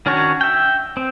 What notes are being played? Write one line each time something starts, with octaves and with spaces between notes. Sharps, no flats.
D#3 C#4 D4 F#4 C#5
E5 G5
C4